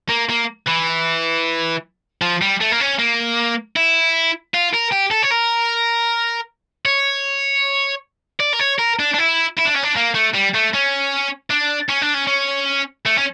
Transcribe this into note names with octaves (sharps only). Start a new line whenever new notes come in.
A#3
A#3
E3
F3
G3
A3
A#3
C#4
A#3
E4
F4
A#4
G4
A4
C#5
A#4
C#5
D5
A#4
C#5
A#4
D4
D4
E4
E4
D4
C#4
D4
A#3
A3
G3
A3
C#4
D4
C#4
D4
C#4
C#4
A3
C#4